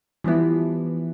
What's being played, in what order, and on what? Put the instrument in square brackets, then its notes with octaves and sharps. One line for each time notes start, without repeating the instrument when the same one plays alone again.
[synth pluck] E3 F3 G3 B3 E4